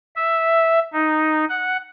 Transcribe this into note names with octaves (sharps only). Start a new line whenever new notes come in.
E5
D#4
F#5